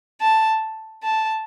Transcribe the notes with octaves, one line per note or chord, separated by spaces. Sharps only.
A5
A5